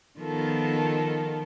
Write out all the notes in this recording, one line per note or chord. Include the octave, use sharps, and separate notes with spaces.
D#3 F3 B3 F4 A4 A#4